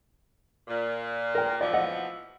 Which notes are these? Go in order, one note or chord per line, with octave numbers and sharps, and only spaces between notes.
A#2
A#4 G5
B2 E3 F3 D5
D#5 F#5